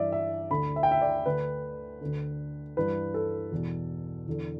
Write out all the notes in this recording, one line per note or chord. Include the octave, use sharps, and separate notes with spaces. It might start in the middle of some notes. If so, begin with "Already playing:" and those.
Already playing: G2 E3 D5 E5
E5
D2 D3 B5
E5
G5
E5
D5
D2 D3 B4
D2 D3
G2 E3 B4
A4
E2 B2
E2 D3